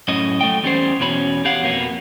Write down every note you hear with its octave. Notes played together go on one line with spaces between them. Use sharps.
F#2 A2 C#4 D#5
F#3 A3 G5
E2 G3 C#4 C5
E2 B2 C#4 B5
G4 C#5 F5 F#5
F2 B2 A#3 B3